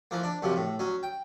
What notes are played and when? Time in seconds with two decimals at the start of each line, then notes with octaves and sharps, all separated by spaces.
0.11 E3 F3 A#3
0.23 D4
0.42 F#2 C3 F3
0.56 A2
0.79 F#3 C#4
1.03 G5